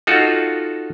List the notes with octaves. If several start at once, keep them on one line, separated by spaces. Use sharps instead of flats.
D#4 F4 F#4 A4